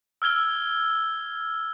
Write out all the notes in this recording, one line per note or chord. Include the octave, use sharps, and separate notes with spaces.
E6 F6 G#6 G7